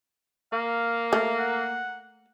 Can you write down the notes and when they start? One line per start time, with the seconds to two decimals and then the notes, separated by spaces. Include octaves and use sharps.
0.53 A#3 F5
1.13 A3
1.38 F#5